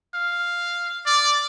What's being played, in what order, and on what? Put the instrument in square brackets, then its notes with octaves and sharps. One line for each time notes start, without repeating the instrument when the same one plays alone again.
[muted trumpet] F5
[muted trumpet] D5 [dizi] D6